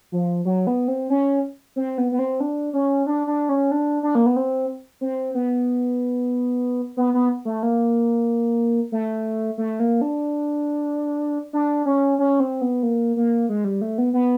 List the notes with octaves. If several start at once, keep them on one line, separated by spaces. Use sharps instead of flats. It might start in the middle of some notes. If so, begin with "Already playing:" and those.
F3
F#3
B3
C4
C#4
C4
B3
B3
C4
D4
C#4
D4
D4
C#4
D4
D4
A#3
B3
C4
C4
B3
B3
B3
A3
A#3
A3
A3
A#3
D4
D4
C#4
C#4
C4
B3
A#3
A#3
G#3
G3
A3
B3
B3